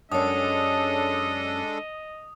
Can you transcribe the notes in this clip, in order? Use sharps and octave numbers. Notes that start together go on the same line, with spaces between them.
F#2 G#3 C#4 D4 A4 D#5 D#6